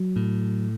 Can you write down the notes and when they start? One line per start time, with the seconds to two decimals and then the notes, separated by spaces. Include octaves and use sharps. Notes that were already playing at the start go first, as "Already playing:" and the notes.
Already playing: F#3
0.16 A2